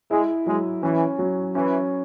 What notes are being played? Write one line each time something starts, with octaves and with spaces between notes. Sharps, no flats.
G#3 E4
F#3 G#3
E3 C#4
F#3
E3 C#4